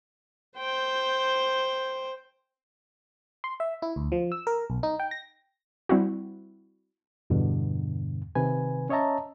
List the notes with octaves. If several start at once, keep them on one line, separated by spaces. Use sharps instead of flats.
C5 G5
C6
E5
E4
D2
F3
E6
A#4
B1
D#4
G5
A#6
G3 C4 E4 F#4
E2 G2 B2 D3
C3 D#3 B4 G#5
C#4 C#5 D#5 E5 A5 A#5